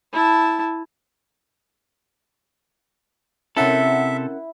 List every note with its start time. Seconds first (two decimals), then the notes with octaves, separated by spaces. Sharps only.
0.13 E4 A5
3.57 C3 C#4 E4 A4 A#4 E5 F#5